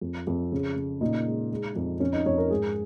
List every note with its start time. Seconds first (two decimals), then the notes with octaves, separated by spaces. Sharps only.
0.01 F2
0.27 F2
0.52 C#3
0.76 C#3
1.01 A#2 D#4
1.26 G#3
1.51 G#3
1.76 F2
2.00 F2 C#4
2.13 D#4
2.26 F2 C#5
2.38 A#4
2.50 G#2 G#4